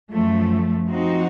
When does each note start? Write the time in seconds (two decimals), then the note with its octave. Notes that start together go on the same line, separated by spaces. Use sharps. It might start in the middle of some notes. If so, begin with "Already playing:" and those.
0.10 F#2 F3 A3
0.86 F3 C4 D#4 F#4